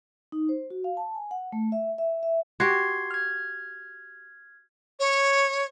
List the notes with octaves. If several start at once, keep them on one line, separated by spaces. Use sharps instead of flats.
D#4
C5
F#4
F5
A5
G#5
F#5
A3
E5
E5
E5
F#4 G4 C6 G#6 C7
F6 G#6
C#5